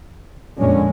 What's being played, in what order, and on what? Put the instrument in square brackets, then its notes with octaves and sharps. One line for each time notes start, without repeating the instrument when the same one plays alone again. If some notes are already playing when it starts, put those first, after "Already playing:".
[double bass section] F2 A#2 G#3 [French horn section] D3 C#4